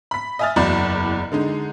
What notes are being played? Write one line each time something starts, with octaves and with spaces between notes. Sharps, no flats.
B5 B6
D#5 E5 G#5 D#6 F6 A6
F#1 E2 F#4 D5 B5 E7
D3 G#3 D#4